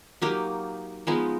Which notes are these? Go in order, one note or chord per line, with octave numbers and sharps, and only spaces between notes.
F#3 A#3 D#4 G4
F3 G#3 B3 D#4